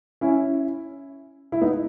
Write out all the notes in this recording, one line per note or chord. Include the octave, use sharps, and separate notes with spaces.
C#4 E4
E4
B3 D#4